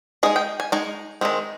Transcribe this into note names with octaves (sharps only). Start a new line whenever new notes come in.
G#3 D#4 G#4
G5
G#5
G#3 D#4 G#5
D#3 G#3 C4